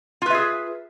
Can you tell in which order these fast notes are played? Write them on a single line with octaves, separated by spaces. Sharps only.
F4 B4 E5 G#4